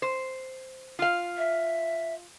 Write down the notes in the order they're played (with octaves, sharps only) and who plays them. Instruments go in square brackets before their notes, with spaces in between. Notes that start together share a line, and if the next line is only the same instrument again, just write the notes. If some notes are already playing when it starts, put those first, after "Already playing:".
[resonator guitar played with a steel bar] C5
F4 F5
[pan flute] E5